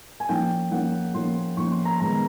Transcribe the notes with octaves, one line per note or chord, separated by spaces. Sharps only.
G#5
F3 A#3 C#4 G5
F3 A#3 C#4 F#5
F3 A#3 C#4 C6
F3 A#3 C#4 C#6
C6
A#5
D#3 G#3 B3 A#5